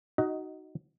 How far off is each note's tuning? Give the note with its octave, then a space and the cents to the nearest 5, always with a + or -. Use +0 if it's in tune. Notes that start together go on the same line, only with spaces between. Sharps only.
D#4 +0 F#4 +15 D#5 +15